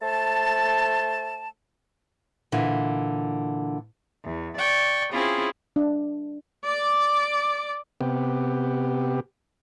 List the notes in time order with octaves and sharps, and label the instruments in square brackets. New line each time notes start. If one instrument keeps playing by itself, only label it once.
[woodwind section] A3 C5 A5
[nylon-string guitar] A#2 D3 E3
[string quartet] E2
D5 G5 C#6
C4 C#4 E4 F4 G#4
[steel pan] D4
[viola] D5 D6
[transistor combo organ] C3 B3 G4